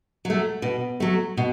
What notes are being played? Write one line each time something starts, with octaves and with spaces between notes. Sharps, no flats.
F#3 A3
B2
F#3 A3
B2